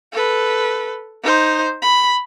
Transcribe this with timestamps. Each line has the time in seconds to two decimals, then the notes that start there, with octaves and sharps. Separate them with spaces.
0.13 A4 B4
1.23 D#4 C5
1.82 B5